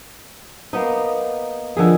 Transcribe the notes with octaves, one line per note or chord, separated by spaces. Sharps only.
A#3 B3 D#4
D3 D#3 F3 G#4